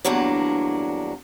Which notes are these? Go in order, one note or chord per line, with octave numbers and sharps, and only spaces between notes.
E2 G2 F#3 A#3 D4